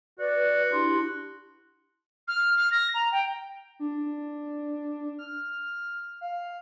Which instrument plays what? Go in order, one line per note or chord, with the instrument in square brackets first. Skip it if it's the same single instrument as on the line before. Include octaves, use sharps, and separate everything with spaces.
[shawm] F#4 [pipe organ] B4 [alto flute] D5
[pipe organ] D4 E4 G4 [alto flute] C6
[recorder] F6
F6
A#6
A#5
G5
[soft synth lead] D4
F6
F5